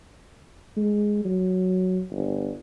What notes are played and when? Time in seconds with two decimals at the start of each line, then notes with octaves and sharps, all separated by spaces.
0.77 G#3
1.25 F#3
2.11 G1